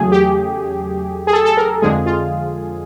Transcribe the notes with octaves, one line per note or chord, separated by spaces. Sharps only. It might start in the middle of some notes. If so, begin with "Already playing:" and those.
Already playing: E2 C#3 F#3 A3 G#4
G4
G#4
A4
A4
A#4
F2 D3 F3 G#3 G#4
F4